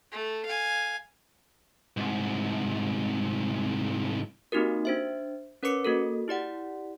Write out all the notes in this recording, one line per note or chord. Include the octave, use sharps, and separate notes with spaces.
A3
F5 G#5
C2 G#2
A#3 C4 D#4 F#4 G4 A#4
D4 C5 E5
C#4 A#4 B4 C#5 D6 C#7
A#3 F#4 A4 A#4
E4 G4 D5 F#5